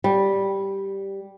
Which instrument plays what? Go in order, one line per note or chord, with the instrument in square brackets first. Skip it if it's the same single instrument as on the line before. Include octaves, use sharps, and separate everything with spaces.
[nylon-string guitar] G3